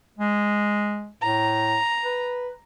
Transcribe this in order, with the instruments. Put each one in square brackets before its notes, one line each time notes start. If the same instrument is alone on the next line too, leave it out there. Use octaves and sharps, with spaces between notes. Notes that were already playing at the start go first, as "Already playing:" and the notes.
[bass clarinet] G#3
[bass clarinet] A2 [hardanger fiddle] A#5
[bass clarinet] B4